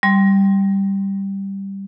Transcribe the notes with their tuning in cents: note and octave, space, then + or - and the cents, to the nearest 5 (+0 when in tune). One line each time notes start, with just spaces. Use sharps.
G3 +0 C6 +0